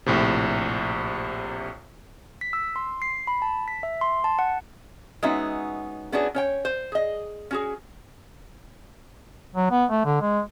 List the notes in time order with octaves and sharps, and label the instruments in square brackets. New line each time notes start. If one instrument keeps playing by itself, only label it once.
[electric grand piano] A#1 A2 C3
[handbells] B6
E6
C6
C7
B5
A5
B6
E5
C6
A5
F#5
[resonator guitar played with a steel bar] G#3 B3 C#4 D#4 F#4 E5
B3 C#4 D4 E4 F#4 G#4
C#4 C#5 G5
C5
G#4 D#5
C#4 F#4 G#4
[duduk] F#3
B3
A3
D3
G#3